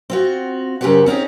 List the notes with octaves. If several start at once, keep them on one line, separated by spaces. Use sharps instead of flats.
C4 F4 F#4
F#2 C#3 F#3 G4 C5 F#5
C4 C#4 D#4 G#4